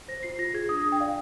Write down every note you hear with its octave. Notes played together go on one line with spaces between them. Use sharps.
C5 A#6
F4 C7
F4 A#6
G#4 G#6
D4 D#6
D4
G5
D5 F5